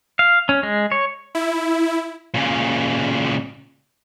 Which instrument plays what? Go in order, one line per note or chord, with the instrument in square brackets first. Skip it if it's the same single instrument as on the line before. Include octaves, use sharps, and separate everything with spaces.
[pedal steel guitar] F5
C#4
G#3
C#5
[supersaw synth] E4
[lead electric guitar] A#2 C#3